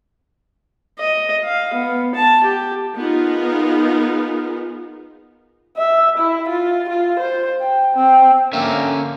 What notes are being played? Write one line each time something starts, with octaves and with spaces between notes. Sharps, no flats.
D#5
F5
B3
A5
G4
B3 D#4 F4 G#4 A#4
E5
E4
F4
F4
C5
G5
C4
D3 A#3 C#4 E5